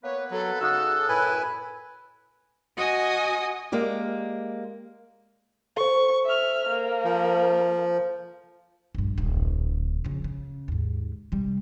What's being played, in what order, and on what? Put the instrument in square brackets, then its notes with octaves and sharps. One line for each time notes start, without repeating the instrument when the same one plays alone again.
[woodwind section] A#3 B3 B4 [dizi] C#5
[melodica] F#3 [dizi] A4
[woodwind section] C#3 E6 [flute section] D#4 F#6 [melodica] F#4
[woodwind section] F#2 A2 E4 [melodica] B4 G#5
[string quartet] F#4 D#5 G#5 D#6
[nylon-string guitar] G#3 A#3 G4 D5
[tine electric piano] A4 C5 [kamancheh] C#6
[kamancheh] E5 F6
A#3
[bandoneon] F3
[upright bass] A#1 G2
D1 A#1
F2 C#3
C#3
D#2 G#2
C3 G3